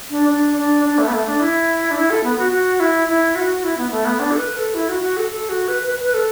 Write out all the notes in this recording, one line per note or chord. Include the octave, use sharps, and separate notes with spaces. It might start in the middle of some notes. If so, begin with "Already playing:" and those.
D4
D4
D4
D4
A3
B3
A3
D4
E4
D4
E4
A4
B3
F#4
F#4
E4
E4
F#4
E4
B3
A3
B3
D4
A4
B4
A4
E4
F#4
F#4
A4
A4
F#4
B4
B4
B4
A4